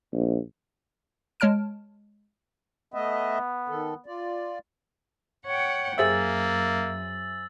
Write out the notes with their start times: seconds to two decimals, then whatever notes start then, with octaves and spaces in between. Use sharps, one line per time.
0.14 A#1
1.40 G#3 C#5 A5 F6 D7
2.94 A3 B3 D#5 E5
3.68 D#3 A4
4.06 F4 D5
5.45 C#5 F#5 G5
5.98 F#2 A#3 G#4 C5 E5 E6 A6 F#7